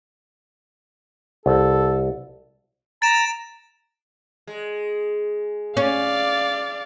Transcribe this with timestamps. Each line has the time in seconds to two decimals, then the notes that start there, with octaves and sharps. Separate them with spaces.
1.46 C2 A4
3.02 A#5 A6 D7 E7
4.47 G#3
5.77 C#4 D5 F5